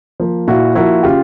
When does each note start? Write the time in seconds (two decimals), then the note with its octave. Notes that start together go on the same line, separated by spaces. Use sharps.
0.20 F3 A#3
0.48 A#2 E4 F#4
0.75 F3 A#3 E4 F#4
1.03 C#3 F4 G4